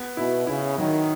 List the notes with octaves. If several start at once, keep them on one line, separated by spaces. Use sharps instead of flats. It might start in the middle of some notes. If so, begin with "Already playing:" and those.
Already playing: B3
B2 E4
C#3 E4
D#3 F#3